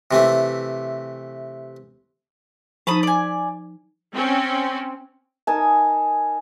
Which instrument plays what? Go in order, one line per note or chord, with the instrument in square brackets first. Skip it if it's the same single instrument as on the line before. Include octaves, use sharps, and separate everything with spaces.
[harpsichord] C3 E3 A3
[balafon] F3 D#4 [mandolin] A5 B5 D#6
[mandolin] D5 G#5
[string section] C4 C#4
[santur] D#4 A#4 G#5 A5